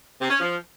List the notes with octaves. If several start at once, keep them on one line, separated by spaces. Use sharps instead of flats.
C3
C#4
F3